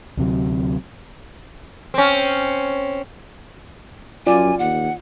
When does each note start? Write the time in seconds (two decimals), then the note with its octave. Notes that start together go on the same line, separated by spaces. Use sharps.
0.17 D2 C3 F#3
1.94 C4 C#4
4.27 F#2 F4 D5 G#5
4.59 D#2 F#5